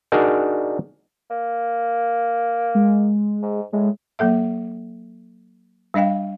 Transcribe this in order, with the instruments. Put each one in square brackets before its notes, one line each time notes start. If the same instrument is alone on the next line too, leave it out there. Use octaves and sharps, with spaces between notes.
[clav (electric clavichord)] D4 D#4 F#4 G#4 A#4 D5
[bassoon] A#3
[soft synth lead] G#3
[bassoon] G#2
[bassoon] A2 [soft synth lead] G#3
[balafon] F#3 A#3 A4 E5
G3 D4 D#5 F5 G5